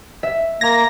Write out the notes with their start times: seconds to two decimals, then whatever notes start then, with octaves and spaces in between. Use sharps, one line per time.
0.23 E5
0.61 A#3 A#5 G#6 A#6